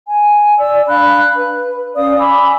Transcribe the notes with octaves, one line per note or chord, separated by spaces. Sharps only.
G#5
D5 E6
D4 F5 B5 F#6
B4
C#4 D5 F5 D#6
G#5 B5 D6 E6